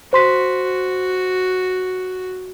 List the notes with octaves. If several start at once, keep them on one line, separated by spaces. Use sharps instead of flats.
F#4 C5 C6 B6